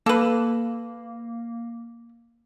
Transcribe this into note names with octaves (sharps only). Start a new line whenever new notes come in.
A#3 A4 B4